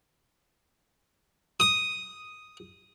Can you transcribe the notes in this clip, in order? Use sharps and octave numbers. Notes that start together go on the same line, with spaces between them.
D#6